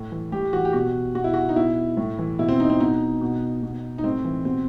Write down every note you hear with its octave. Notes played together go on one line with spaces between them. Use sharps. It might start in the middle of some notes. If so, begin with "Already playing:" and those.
Already playing: A2
E3
A2 G4
E3 F#4
G4
B2 F#4
B2 F#4
E4
F#4
D#4
B2 E4
A2
E3
B2 E4
C4
D#4
C4
B2 D#4
B2
B2
D#4
A2 C4
E3
B2 C4